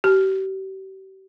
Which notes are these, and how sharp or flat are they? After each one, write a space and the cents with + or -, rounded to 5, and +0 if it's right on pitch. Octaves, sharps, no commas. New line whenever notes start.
G4 -40